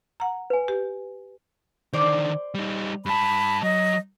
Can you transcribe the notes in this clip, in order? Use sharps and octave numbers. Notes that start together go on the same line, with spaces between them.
F#5 A#5
B4 G#5
G4
D3 D#3 C5 D5
G3 D#4
G2 A5 B5
F#3 D#5